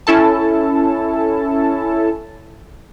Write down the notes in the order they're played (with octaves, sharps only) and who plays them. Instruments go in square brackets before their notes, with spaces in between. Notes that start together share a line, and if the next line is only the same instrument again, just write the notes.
[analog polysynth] C#4 E4 A4 A5